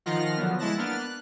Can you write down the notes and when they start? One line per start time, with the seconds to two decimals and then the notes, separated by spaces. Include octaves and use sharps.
0.06 D#3 F3 F4 F#5 F6 A#6
0.37 D3 F3 F#3 B3
0.58 G#3 E4 A5 F#6 A#6
0.77 A#3 B3 D4 F6 A6
0.97 F#6